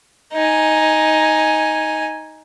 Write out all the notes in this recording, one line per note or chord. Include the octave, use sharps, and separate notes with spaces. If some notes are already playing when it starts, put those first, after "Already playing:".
D#4 G#5